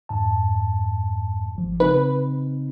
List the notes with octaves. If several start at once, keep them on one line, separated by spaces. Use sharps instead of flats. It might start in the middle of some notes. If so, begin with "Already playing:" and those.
F2 G#2 A5
G#1 F3
C#3 C4 D#4 B4